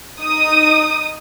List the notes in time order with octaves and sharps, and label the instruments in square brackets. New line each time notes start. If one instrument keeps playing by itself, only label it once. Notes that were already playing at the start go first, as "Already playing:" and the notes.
[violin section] D#4 D#6